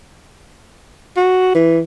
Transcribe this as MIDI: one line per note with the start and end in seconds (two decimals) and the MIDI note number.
1.17 1.54 66
1.55 1.81 52